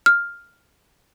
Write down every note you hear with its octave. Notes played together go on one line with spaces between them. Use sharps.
F6